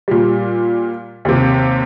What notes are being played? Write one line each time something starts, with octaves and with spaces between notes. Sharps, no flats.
A#2 G3
D#2 C3